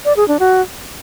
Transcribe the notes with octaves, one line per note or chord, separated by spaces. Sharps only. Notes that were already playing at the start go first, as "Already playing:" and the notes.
D5
G#4
D4
F#4